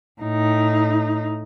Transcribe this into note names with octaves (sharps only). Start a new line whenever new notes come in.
A2 D#4